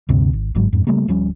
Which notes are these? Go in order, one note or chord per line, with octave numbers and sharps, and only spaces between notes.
D2 G2 C3 C4
G#1
G1 G#2 F#3 G#3
F2 G#2
C#3 G3 A3 A#3
D1 F3 G3 C#4